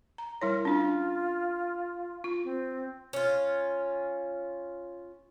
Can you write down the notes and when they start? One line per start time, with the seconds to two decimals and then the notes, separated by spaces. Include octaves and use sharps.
0.18 A#5
0.41 G3 E4 A#4 C#5
0.65 C#4 D4 F4
2.24 F4
2.44 C4
3.13 C#4 F4